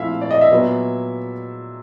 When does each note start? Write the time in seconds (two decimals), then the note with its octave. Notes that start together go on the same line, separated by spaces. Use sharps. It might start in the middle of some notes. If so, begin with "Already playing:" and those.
Already playing: A#2 F3 A3 C4 E4 E5 F5
0.21 D5
0.31 D#5
0.41 E5
0.51 A#2 F#3 B3